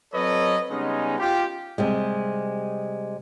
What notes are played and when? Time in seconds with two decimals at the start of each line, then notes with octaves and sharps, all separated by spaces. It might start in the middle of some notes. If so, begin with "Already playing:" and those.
0.14 F#3 C4 A4 B4 C#5 D#5
0.71 C#3 G3 G#3 B3 C#4 D#4
1.19 F4 G4
1.78 C3 G3 G#3